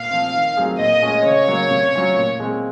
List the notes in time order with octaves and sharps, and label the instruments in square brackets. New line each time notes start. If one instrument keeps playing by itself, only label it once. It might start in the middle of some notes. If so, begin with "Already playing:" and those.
Already playing: [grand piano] A#2 [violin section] F5
[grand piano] F3 C4
D#3
F#3 C4 F4 G#4
[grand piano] A#2 [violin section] D#5
[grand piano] G#3 C#4
[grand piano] C#3 [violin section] C#5
[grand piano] F#3 A#3
C3
F#3 C#4 F4
A#2
G#3 C4 F4